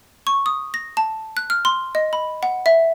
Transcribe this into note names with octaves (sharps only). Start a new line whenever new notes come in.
C#6
D#6
A#6
A5
F#6
F6
C6
D#5
B5
F#5
E5